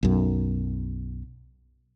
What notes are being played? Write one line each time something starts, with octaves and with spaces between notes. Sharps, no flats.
B1 F#2